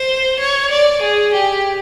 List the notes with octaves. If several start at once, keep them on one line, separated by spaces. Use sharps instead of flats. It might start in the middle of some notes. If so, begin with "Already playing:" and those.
Already playing: C5
C#5
D5
G#4
G4